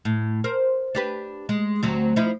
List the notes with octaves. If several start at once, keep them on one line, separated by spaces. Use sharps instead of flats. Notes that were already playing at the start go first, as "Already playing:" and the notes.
A2
A#4 C5
D4 G4 B4
G#3
D2 F#3 C4
F3 D#4 E4